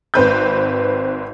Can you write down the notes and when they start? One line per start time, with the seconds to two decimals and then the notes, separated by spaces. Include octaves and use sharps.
0.14 G#1 C4 B4 G6